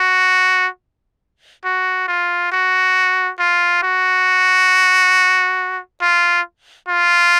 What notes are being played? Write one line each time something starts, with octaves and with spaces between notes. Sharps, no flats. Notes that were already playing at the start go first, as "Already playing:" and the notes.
Already playing: F#4
F#4
F4
F#4
F4
F#4
F4
F4